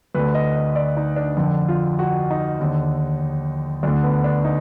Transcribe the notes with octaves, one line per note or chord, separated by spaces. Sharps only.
D2 D3 B4
D#5
D#5
D5
D#4
D4
F2 D3
F4
F#4
D#4
D#2 D3
D2 D3 D4
B3
D4
D#4